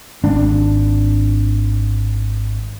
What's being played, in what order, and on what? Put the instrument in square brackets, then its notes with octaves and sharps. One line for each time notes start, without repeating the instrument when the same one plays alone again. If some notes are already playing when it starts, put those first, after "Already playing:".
[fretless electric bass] G#1 D4